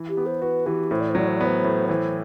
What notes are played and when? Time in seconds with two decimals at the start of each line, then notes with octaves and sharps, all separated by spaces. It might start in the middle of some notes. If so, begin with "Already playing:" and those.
Already playing: E3
0.09 G4
0.17 B3
0.26 C5
0.42 F#4 B4
0.66 E3 G4
0.91 A2 C5
1.00 D5
1.09 C5
1.15 F#3 D5
1.27 C5
1.36 D5
1.40 B3 C5
1.64 A2
1.89 E3 C5